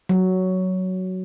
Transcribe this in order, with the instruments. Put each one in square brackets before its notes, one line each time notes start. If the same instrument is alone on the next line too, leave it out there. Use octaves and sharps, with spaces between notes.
[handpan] F#3